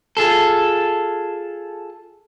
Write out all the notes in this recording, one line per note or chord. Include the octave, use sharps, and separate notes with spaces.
F4 G#4 A4